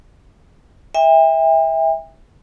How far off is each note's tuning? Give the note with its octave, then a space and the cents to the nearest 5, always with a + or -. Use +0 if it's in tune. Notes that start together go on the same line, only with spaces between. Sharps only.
E5 -15 G5 +40